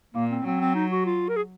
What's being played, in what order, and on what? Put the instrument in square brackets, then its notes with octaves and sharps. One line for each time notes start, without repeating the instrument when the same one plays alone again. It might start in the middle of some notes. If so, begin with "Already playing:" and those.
[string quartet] A#2 [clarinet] A#3
[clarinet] C4
[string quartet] F#3 [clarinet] C4
[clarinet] C4
D#4
F#4
F4
A#4
G#4